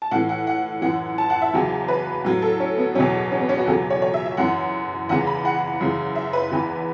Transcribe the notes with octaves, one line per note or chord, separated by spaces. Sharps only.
A5
A2 E3 F#5
F#5
F#5
F#2 E3 F#5
A5
F#5
E5
E2 C#3 F#3
B4
A2 F#3
A4
C#4
B3
E2 B2 F#3 C#4
C#4
B3
C#4
F#4
E2 C#3 F#3 A4
C#5
C#5
E5
E5
F#2 E3 F#5
E2 C#3 E3 F#5
B5
F#5
F#2 C#3 E3
E5
B4
E2 E3